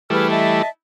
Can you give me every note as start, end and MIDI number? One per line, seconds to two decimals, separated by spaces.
0.10 0.62 52
0.10 0.62 55
0.10 0.62 57
0.10 0.27 68
0.10 0.27 71
0.10 0.27 89
0.30 0.67 75
0.30 0.67 76
0.30 0.67 81